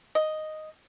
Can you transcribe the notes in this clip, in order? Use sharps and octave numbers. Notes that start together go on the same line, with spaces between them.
D#5